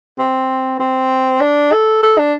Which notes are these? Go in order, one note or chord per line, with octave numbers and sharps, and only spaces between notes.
C4
C4
D4
A4
A4
D4